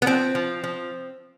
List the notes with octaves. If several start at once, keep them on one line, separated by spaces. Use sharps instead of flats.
B3
F3 C4
F3
F3